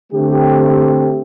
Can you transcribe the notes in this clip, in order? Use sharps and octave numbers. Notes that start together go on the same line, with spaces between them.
D3 A3 C4 G4